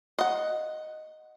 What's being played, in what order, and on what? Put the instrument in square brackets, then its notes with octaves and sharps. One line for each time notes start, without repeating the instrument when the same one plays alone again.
[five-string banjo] D#5 F#5